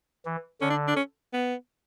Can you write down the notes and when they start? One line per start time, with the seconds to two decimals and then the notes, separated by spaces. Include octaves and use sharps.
0.25 E3
0.61 D3 C#4
0.70 D4
0.88 D4
0.97 C#4
1.33 B3